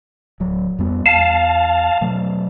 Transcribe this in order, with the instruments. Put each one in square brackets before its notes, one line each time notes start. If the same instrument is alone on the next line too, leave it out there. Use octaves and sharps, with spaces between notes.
[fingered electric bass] D1 F#3
F2 G3 B3
[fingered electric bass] E2 [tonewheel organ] F5 A5
[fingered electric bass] B2 F#3 A3